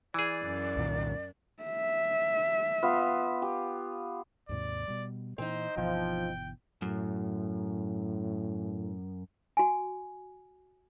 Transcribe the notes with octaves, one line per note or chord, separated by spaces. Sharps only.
E3 G#4 D5
F#2
C2 A#2 D#3
E5
B3 F4
G4
D#2 G#2 C3 D5
B2 G3
A#2 E3 C4 D#4 C5
G1 B2 E3 F3 G5
F#2 A2
F#4 G#5